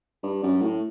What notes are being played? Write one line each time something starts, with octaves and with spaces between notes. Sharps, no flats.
G2
F#2
A2